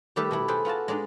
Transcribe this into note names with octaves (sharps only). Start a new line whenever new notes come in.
D#3 G3 A3 G4 B4 E5
B2 A3 E4
G#4 A4 B4 C5 G5
B3 F4 F#4 A5
G#3 D4 D#4 D5